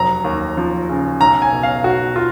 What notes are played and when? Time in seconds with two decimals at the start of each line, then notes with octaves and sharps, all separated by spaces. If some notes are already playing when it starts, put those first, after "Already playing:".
Already playing: F1 F#3 A#5
0.24 D#2
0.57 F3
0.89 C#3
1.21 B1 A#5
1.42 G#5
1.52 B2
1.63 F5
1.84 B1 F#4
2.16 F4